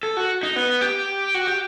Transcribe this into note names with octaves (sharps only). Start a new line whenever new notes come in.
A4
F#4
D#4
B3
G4
F#4
G4